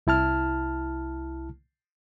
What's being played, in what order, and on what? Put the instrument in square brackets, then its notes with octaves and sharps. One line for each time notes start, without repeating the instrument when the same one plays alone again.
[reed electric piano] C2 E4 A5 F6